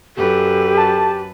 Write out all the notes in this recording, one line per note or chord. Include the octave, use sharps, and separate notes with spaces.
F#2 G4 A4 B4
A5